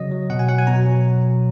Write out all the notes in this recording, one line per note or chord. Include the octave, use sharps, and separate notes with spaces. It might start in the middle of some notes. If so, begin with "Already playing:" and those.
Already playing: C#3 F#3 D#5
F#3
B2 F#5
G#5
F#3 F#5
G#5
B2 A#5
F#3